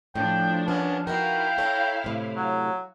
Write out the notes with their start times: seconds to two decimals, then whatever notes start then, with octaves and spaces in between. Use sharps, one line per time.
0.15 A2 F3 D4 G5
0.68 G3 B3 C#4 A#4
1.07 D#4 E4 F#4 A#4 F5 G5
1.58 A4 C#5 A#5
2.04 A2 C3
2.36 F#3